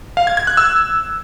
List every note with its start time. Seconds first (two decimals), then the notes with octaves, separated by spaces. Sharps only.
0.17 F5
0.27 G#6
0.37 G#6
0.47 F#6
0.57 E6